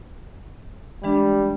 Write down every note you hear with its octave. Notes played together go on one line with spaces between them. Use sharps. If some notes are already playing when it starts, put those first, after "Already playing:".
E3 G3 G#3 D4